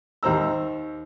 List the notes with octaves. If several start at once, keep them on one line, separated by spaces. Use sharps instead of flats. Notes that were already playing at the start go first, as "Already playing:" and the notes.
D#2 D#3 C5 A#5 E6